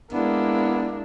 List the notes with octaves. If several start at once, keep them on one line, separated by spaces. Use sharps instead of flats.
G#3 A#3 B3 D4 E4